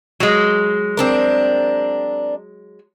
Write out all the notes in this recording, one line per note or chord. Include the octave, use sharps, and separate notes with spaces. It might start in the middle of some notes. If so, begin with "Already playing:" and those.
F#3 G#3
C4 D4 A#4